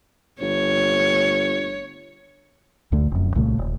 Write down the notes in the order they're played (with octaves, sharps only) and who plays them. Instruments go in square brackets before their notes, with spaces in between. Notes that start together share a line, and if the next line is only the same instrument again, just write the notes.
[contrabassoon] G1 [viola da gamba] C#5
[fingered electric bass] D2 D3 A3
F1 F#2
C2 A#2 C#3 A3
D#1